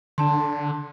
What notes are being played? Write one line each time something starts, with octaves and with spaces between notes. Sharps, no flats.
D3 D4 A5 C6